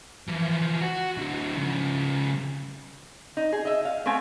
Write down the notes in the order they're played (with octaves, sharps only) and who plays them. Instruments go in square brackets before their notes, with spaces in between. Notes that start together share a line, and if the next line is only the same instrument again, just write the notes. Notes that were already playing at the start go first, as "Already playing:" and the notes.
[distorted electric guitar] E3 F3
F#4
D3 F#3
C#3 F3
[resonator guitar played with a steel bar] D#4
G#4
D#5 E5
F5
A3 B3 C4 G#5